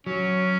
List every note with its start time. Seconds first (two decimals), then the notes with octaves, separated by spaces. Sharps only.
0.07 F#3 C#4